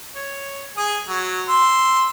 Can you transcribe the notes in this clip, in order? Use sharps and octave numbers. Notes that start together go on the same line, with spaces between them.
C#5
G#4 D#6
F#3
C6 E6